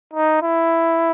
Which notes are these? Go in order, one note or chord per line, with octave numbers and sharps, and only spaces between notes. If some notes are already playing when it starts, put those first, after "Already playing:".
D#4
E4